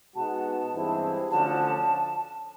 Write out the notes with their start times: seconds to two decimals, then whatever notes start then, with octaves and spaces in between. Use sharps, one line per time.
0.15 B2 G#3 B3 D#4 F#4 A5
0.73 G2 E3 G#3 C4 E4
1.30 D3 F3 A3 C#4 F#4 A5